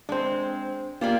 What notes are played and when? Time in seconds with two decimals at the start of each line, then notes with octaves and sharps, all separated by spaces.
0.09 G#3 C4 D4 C5
1.01 A#3 F4 G4 D5 G5